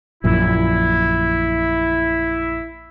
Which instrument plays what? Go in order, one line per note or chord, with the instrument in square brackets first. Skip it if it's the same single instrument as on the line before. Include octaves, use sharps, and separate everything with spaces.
[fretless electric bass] A#1 F#2 A#2 [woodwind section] E4